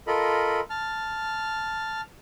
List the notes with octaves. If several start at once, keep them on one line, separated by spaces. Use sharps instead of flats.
F4 A4 A#4 D#5 B5
A5 F6